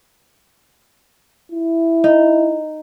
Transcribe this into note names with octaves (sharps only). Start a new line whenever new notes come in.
E4
D#4